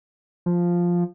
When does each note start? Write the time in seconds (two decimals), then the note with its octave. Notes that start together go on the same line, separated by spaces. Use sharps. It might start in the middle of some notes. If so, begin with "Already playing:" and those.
0.46 F3